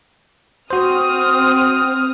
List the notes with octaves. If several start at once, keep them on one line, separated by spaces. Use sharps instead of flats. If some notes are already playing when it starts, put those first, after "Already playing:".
C4 F#4 C5 D#6 F6